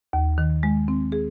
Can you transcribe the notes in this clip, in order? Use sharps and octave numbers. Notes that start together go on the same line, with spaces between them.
D#2
D#3
G#3
C4
G#4